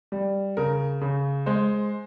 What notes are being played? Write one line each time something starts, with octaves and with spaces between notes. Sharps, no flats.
G3
C#3 A#4
C#3
G#3 C5